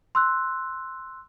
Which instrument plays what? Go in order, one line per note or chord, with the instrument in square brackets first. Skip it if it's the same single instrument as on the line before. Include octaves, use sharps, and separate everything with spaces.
[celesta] C6 E6 F#6